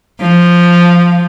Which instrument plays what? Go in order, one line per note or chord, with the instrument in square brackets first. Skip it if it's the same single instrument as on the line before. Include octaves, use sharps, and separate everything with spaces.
[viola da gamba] F3